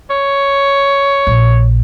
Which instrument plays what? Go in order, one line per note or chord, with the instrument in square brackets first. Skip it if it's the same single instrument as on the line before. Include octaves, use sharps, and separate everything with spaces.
[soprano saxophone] C#5
[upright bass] A#1